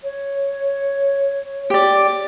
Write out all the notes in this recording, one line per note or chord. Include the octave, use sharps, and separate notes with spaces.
C#5
G4 D5